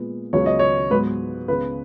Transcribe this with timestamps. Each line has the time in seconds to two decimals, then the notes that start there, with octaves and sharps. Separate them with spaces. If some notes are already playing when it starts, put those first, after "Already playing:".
Already playing: A#2 G#3 B3
0.33 C#2 C#3 F#3 B3 C#5
0.46 D#5
0.59 C#5
0.90 G#2 F#3 B3 B4
1.48 C#2 C#3 G#3 B3 B4